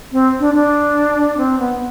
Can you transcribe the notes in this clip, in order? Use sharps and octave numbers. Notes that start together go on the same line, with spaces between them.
C4
D4
D4
C4
B3